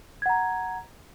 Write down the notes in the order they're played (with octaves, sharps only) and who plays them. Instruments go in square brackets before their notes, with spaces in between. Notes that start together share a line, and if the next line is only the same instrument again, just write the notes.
[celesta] G#6
F#5
A#5